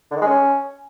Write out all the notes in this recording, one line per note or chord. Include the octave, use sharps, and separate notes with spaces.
D3
D#3
G#3
C#4